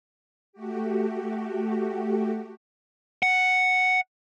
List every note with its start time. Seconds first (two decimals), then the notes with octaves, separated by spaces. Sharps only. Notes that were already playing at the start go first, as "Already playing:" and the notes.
0.53 A3 F#4 G4
3.23 F#5